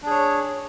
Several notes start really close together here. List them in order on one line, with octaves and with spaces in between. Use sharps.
D4 G#4 C#5